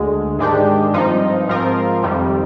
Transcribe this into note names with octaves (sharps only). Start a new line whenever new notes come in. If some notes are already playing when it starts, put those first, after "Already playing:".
Already playing: D2 D3 G#3
G#2 D#3 G#3 D4 G4
G2 F3 C4 D#4
G#2 F3 C4 F4 A#4
F2 C3 D#3 G3